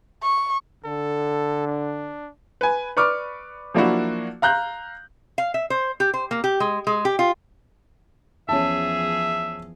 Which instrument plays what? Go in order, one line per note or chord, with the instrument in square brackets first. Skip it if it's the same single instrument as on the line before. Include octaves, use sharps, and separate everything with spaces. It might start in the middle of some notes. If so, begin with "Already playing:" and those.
[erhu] C#6
[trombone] D3 [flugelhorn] A4
[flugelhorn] D4
[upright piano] B4 G#5
B4 D5 C#6 D6 F6
F3 F#3 A#3 D4 E4 F#4
F5 A#5 F#6 G6
[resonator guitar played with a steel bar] F5
E5
C5
G4
C5
A#3
G4
G#3
G#3
G4
F4
[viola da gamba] E2 F3 G#4 [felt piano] C#4 A5 [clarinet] E5